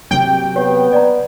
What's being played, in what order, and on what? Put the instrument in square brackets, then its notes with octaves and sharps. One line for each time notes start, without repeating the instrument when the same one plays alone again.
[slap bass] C3 F#3 A#3 [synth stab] G5
[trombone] B3 [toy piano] G4 C#5
[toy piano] D5 A#5